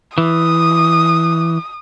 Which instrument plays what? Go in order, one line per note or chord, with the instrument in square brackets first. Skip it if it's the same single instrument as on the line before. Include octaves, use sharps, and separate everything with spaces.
[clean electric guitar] E3 [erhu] D#6